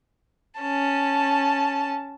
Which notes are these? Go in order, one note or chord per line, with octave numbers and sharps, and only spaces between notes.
C#4 A5